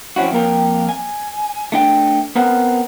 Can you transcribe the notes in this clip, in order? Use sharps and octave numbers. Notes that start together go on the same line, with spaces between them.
F3 C4 C#4 E4 F#4
F2 A#3 A#4 G5
G#5
A3 D4 G5
B3 C4 A#4 F#5